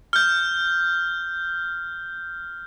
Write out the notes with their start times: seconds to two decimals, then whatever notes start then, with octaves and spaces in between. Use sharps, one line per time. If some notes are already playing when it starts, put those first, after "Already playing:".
0.13 F6 G6